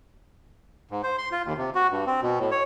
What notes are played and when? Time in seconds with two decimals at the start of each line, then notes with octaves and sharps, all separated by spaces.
0.91 G#2
1.03 C5
1.18 C6
1.32 F4
1.45 D#2
1.58 C3
1.75 F#4
1.91 G2
2.07 C4
2.23 B2
2.39 A2
2.51 C#5